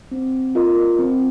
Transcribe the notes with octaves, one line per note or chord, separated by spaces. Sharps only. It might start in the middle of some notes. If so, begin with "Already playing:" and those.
C4
F4 A#4 D#5
C4